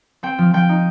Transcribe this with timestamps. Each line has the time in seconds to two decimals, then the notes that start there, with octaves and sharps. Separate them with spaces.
0.23 C4 G5
0.38 F3
0.53 F3 G5
0.69 D#4